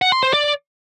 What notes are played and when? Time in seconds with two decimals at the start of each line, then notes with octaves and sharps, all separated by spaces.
0.02 F#5
0.12 C6
0.23 C5
0.33 D5